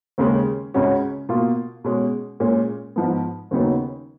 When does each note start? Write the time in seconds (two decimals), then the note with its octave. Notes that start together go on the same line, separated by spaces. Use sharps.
0.18 D#2 C#3 G#3
0.74 C#2 C#3 G#3 C#4 F#4
1.29 B2 A#3 F4
1.84 B2 G#3 C#4
2.40 A#2 G#3 C#4
2.96 G#2 F3 B3
3.51 D#2 C#3 F#3 B3 D#4